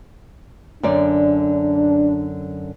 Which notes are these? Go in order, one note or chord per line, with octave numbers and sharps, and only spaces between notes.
F#2 D3 D4 D5